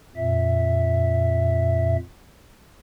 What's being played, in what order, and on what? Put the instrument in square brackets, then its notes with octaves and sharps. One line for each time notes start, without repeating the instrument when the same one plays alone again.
[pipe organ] F2 A#2 E5